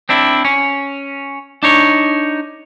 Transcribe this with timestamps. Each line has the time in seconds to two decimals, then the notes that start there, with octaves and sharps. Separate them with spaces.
0.09 C4 D4 E4
0.45 C#4
1.63 D4 D#4 C#5